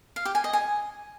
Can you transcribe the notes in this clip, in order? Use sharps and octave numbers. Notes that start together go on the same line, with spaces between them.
F5
G4
G#5
D#5
G#5